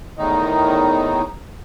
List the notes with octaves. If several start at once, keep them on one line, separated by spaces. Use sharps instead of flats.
E2 A2 D#3 D#4